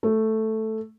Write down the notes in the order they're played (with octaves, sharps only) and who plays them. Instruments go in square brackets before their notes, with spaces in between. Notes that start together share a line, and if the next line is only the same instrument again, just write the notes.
[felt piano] A3